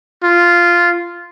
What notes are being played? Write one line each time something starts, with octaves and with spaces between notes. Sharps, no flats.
F4